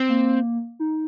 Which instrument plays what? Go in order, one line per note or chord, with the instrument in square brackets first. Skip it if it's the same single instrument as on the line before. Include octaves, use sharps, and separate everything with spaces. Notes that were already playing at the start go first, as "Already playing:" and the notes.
Already playing: [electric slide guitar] C4
[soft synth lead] A#3
D#4